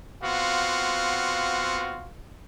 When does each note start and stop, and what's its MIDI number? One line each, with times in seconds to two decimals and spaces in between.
0.23 2.12 59
0.23 2.12 60
0.23 2.12 65
0.23 2.12 66
0.23 2.12 77